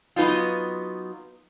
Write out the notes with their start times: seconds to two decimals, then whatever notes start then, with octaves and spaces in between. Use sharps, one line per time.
0.16 F#3 B3 D#4 F4